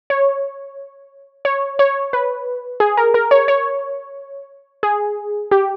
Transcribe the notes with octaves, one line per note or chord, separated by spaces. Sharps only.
C#5
C#5
C#5
B4
G#4
A#4
A#4
C#5
C#5
G#4
G4